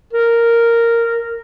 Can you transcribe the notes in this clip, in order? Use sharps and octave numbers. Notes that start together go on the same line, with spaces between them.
A#4